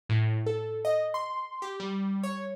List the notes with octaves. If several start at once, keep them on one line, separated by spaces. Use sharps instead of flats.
A2
A4
D#5
C6
G4
G3
C#5